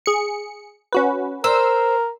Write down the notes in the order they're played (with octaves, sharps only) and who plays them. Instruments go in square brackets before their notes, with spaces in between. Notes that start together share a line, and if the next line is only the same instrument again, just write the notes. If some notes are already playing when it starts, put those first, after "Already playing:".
[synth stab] G#4 C#7
C#4 F#4 B4
[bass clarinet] A#4 [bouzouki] C5 [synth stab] E6